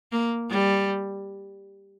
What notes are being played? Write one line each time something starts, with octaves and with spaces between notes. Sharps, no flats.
A#3
G3